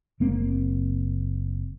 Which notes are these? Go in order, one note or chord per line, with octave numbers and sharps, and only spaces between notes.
F#1 A#3 C4